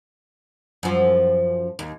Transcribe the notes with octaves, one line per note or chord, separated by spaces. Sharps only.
F#2 F3
D#2